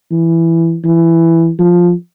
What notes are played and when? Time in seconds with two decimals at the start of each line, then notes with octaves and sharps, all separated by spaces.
0.11 E3
0.84 E3
1.59 F3